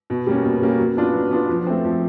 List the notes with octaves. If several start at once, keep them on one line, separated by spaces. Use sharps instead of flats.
B2
G3 A#3 C#4
B2
G3 A#3 C#4
F#3
B3 D4 F4
F#3
B3 D4 F4
F3
A3 C4
F3